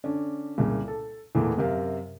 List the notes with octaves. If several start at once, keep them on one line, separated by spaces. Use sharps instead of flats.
D3 C#4 D4
C2 A#2 C#3
A4
E2 A#2 E3 A3
F#2 C3 A#4 F5